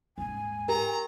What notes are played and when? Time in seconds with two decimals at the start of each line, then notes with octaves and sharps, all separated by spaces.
0.18 D#1 G#2 G#5
0.68 G4 A#4 A#5